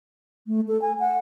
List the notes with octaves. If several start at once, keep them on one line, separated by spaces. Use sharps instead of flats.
A3
A4
G#5
F#5